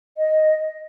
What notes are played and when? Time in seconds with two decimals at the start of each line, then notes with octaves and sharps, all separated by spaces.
0.17 D#5